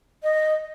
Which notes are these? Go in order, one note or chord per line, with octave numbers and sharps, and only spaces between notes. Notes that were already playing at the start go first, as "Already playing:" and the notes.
D#5